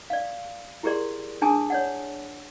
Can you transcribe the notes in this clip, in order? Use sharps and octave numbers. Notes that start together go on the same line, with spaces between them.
D5 F5
E4 G4 G#4 A#4 D5 C6
D4 G#4 G#5 A5 D6 D#6
C#5 D5 F#5